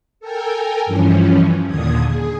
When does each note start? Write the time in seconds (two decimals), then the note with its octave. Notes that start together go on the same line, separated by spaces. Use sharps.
0.20 A4 A#4 G5 G#5
0.86 G2 E3 F3 C#4
1.67 D#2 A#2 D3 D#6 G#6
2.06 G#4